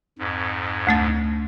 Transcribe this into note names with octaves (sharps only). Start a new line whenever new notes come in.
F2 G#2
D2 A3 A6